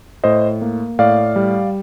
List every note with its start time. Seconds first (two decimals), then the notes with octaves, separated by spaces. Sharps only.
0.24 A2 C5 D#5
0.62 A#3
0.99 A2 D5 F5
1.36 G3